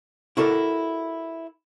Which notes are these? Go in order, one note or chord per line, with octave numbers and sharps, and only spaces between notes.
E4 F#4 A4 A#4 D5